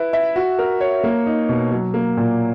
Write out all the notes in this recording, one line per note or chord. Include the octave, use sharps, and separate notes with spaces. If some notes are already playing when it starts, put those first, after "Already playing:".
Already playing: E4 B4
E5
F#4
A#4
C#5
A#3
D#4
B2
F#3
A#3
A#2